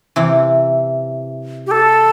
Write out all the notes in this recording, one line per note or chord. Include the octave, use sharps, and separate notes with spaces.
C3 E3
G4
A4